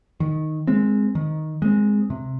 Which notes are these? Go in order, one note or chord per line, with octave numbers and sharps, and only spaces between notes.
D#3
G#3 C4
D#3
G#3 C4
C3